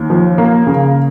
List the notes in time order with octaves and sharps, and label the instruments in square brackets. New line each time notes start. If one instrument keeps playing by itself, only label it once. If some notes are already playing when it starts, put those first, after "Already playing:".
Already playing: [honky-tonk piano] D#2
F3
A#3
C#3